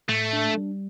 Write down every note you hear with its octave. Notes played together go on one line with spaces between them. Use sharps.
A2 A3
D4
G3